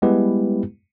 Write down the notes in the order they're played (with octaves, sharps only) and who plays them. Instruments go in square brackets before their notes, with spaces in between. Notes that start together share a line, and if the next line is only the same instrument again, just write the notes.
[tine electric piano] G3 G#3 B3 E4 G4 B4